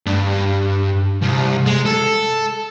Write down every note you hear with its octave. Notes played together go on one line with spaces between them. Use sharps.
G2
C2
G#3
A4